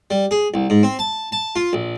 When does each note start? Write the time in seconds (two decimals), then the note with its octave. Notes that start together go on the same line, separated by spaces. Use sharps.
0.11 G3
0.31 G#4
0.54 C2
0.70 G#2
0.83 C4
0.99 A5
1.32 A5
1.56 F4
1.73 A#1